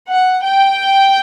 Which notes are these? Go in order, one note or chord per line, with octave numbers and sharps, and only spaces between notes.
F#5
G5